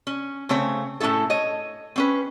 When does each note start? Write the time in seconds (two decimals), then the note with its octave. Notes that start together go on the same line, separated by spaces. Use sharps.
0.07 C#4
0.49 C#3 A3 C4 C#5
1.00 A2 A3 C#4 E4 A4
1.30 C#5 D#5
1.96 C4 C#4 B4